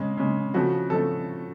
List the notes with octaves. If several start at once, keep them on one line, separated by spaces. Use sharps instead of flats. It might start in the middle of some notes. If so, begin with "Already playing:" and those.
Already playing: C#3 G#3
C#3 G#3
C#3 F3 A3 F#4
C#3 F3 A3 A4